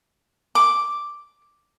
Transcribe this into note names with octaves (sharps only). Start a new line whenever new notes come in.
D6